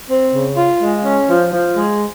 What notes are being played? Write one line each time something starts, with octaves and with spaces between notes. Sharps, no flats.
C4
C#3
F4
G#3
C#4
F3
F3
G#3